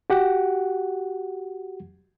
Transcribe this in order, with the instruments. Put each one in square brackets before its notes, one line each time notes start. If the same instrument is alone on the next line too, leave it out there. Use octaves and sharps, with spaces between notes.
[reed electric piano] F#4 G4 F#5